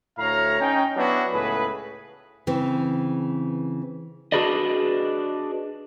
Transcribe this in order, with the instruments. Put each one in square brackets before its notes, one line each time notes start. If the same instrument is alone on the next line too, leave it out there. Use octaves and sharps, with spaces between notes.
[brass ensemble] D2 A2 C#5 F5 A#5
C#4 D#4 G5
F#3 B3 C#4 D4 E4 F#4
C#2 A2 G#4 B4
[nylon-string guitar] C#3 E3 C4
[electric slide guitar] D4 F#4 G#4 B4 D5 D#5